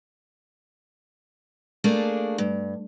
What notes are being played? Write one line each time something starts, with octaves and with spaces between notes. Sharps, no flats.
A3 A#3 D4 G#4
G2